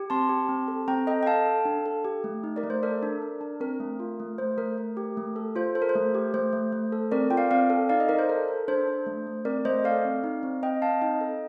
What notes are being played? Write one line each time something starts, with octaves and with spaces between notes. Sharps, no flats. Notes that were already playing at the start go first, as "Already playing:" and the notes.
Already playing: G4
C4 A5 C6
G4
C4
A4
C4 G5 A#5
A4 D#5 G5
G5
A4 F5 A5
A4
D4
A4
G4
A3
D#4
A#4 D5
A3
C5
A4 A#4 D5
D4
D4
D4
C4 A#4
A3
F4
A3
A3 C5
A3 A#4
A3
G4
A3
A4
F4 C5
A4 C5
A#4
C5
A3
G4
A3 C5
A3
A3
A4
C4 A#4 D5
F4 G5
D5 F5
C4 D5 F5
A4
D#4 D5 F5
D#5
D#4 A#4 D5
C5
A4 A#4
A4
D4 C5
D4
A3
A3
C4 A#4 D5
A3 C5 D#5
A4 D5 F5
C4
D#4
C4
C4 D#5 G5
C4 F5 A5
D#4 D#5 G5
A4